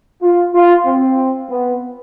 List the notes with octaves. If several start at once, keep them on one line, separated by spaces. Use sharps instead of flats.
F4
F4
C4
B3